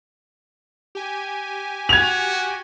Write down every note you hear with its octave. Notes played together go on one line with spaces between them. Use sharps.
G4 G#5
F#4 G#6 F7